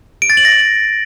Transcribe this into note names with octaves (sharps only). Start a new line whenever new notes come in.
D7
A6
F#7
A#6